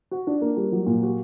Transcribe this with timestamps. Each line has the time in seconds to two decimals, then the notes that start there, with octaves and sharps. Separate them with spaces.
0.11 F#4
0.27 D4
0.42 A#3
0.57 G3
0.72 F#3
0.86 A#2
1.02 F#4